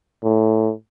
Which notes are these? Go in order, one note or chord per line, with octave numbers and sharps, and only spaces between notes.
A2